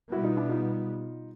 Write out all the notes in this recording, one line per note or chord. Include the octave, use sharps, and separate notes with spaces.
B2 G3 B3 E4 F#4
D#4 F4
D4 E4
D#4 F4